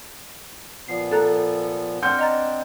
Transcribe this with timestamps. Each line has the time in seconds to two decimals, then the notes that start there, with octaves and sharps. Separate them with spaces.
0.88 A#2 F3 B3 C7
1.11 A4 A#5 F#6 A6
2.03 C4 D4 F#5 C6 F6 G6
2.19 D#5 A#5 A6